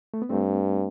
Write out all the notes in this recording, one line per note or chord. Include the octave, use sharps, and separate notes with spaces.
A3
B3
G2 A3 C4